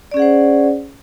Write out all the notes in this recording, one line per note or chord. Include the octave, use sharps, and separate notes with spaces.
C#4 G#4 C5 D5 F#5